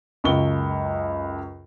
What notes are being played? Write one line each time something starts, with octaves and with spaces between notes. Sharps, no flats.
C#2 F#2 C#6 G7